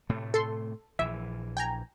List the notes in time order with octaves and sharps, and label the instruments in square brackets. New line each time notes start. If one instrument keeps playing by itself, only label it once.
[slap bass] A2 C3 A3
[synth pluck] A4 C6
[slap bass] A#1 E3 [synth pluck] E5
[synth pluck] G5 G#5 A#5